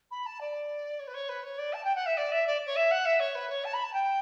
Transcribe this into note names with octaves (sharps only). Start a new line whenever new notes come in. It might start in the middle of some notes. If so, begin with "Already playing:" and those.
B5
A5
D5
C#5
B4
C#5
B4
C#5
D5
A5
G5
F#5
E5
D5
E5
D5
C#5
E5
F#5
E5
C#5
B4
C#5
A5
B5
A5
G5